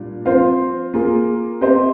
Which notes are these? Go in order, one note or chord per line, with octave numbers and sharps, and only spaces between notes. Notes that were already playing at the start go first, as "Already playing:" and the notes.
Already playing: A#2 G3 D4
F3 C4 F4 C5 F5
A#3 F4 G#4
C4 G4 C5 D#5